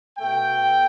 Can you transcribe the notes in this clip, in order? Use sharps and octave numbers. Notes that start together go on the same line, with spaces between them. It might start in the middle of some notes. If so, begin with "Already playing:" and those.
B2 A3 G5